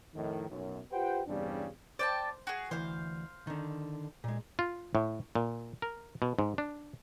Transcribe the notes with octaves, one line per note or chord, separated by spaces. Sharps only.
F2 A2 D#3
B1 F#2
F4 G4 B4 C5 F#5 G5
E2 G2 C#3 G3 C4 D4
C5 D5 G5 A5
F#4 G#4
D2 E3 C5 F5
D3 D#3
A#2 G#3
F4
A2
A#2
A#4
B2
G#2
D4